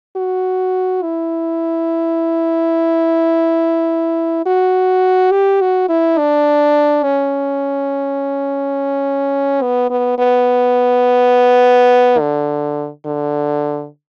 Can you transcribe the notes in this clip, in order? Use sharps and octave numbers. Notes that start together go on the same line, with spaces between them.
F#4
E4
F#4
G4
F#4
E4
D4
C#4
B3
B3
B3
D3
D3